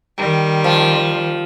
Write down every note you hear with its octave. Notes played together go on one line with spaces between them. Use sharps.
D#3 G3
F3